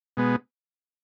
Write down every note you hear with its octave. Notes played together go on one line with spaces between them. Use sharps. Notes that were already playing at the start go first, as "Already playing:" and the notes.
B2 G#3 B3